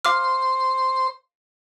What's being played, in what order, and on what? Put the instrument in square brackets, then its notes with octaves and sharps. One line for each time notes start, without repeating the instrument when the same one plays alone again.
[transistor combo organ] C5 C6 [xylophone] F5 D6 F6